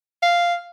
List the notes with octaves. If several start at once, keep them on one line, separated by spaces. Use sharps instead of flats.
F5